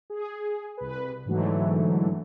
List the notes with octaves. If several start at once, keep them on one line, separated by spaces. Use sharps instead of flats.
G#4
C2 B4
G#2 D3 E3 F#3 A3